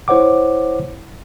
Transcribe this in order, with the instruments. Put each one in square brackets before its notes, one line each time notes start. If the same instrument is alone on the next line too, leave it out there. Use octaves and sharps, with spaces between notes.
[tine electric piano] E4 C5 C#5 F#5 D6